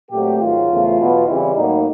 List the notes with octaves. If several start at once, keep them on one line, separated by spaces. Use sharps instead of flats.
A#2 F#3 A3 C4 G4
G#2 D#3 F#3 F4
E2 C#3 F3 A3
E2 B2 F#3 B3
C#3 E3 G3 C4 E4
A2 F#3 A#3 D#4